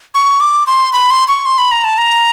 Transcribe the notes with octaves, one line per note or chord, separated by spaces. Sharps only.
C#6
D6
C6
B5
C6
C#6
C6
B5
A#5
A5
A#5